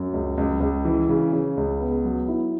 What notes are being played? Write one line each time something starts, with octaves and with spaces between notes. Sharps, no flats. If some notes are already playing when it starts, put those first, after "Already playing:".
Already playing: F#2
C#2
C#2
C#2
E3
C#3
C#3
C#2
B3
F#3
E4